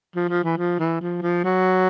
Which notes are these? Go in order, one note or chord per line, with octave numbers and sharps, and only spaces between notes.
F3
F3
E3
F3
E3
F3
F3
F#3